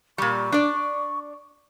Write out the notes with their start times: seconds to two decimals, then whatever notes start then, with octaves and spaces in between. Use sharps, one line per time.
0.18 A#2 G3 C#6
0.52 D4 D5